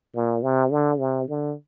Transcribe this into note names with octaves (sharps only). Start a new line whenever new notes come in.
A#2
C3
D3
C3
D3